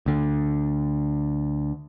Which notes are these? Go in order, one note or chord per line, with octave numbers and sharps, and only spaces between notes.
D2 D3